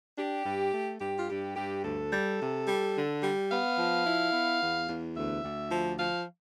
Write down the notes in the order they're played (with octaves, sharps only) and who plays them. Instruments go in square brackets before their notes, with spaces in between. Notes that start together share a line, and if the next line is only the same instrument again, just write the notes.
[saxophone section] D4 G4
G2
A3
G2 G4
F4
G2 G4
G2 G4
D2 A4
G3
C3
G3
D3
G3
B3 F5
F3
E4
B3
E2
E2
D2 E5
D2
F3
F3 F5